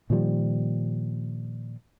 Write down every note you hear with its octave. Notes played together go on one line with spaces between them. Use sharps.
A#2 D#3 F3 G3